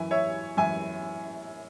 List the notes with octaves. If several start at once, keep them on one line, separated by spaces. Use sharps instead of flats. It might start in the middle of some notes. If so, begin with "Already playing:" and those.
Already playing: F#2 E3 E5 G#5
C#5 E5
F#2 E3 E5 G#5